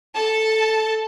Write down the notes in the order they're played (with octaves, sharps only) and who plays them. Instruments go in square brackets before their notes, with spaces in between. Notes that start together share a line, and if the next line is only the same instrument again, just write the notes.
[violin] A4 A5